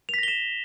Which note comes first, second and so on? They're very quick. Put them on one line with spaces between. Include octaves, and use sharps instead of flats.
F7 B6 A#6 G7 E7